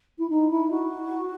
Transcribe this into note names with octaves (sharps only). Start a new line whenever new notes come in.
E4
D#4
E4
F#4